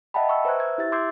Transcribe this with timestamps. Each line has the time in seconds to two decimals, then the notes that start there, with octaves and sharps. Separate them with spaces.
0.14 D#5 E5 F#5 G5 A5 B5
0.29 C#6 E6
0.45 B4 C5 E5 A#5 F#6 G#6
0.60 E6 F#6 G#6
0.78 E4 G4 E5 A6
0.92 C6 D6 E6 G6 G#6 C7